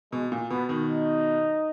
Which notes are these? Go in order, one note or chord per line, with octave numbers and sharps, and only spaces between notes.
B2 G#3
A#2
B2 B3
B2 D#3
D#4